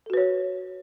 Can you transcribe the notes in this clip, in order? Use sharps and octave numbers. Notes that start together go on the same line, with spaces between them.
F#4 A4 B4 C#5